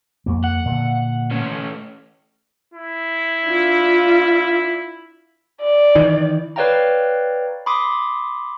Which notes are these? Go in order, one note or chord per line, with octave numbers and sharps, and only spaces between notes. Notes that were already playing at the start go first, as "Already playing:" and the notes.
F2 A#3
F#5
A#2 D3
A3 C#4
E4
D4 F4
D5
D#3 E3
B4 C#5 D5 F5 G5 A#5
B5 C6 D6 D#6